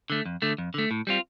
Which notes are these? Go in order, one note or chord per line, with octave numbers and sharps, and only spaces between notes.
D3 A3
F2
D3 A3
F2
D3 A3
A2
G3 C4 F4